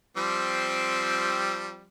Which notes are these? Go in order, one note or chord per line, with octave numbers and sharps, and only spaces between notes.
F3 G3 C4